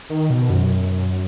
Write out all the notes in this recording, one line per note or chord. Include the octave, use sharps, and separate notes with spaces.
D#3
B2
F#2